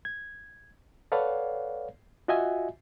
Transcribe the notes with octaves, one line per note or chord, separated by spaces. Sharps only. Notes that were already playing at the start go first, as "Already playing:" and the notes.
G#6
A4 B4 C#5 D5 F5 F#5
F4 F#4 D#5 E5 F#5 G#5